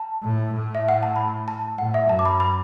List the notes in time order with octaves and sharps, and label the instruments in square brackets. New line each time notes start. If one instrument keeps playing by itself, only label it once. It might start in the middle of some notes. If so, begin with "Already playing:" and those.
Already playing: [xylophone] A5
[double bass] A2
A2
[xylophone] E5
F#5
A5
B5
A5
[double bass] A2 [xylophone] F#5
[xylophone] E5
[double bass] F#2 [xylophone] A5
[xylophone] D6
B5
B5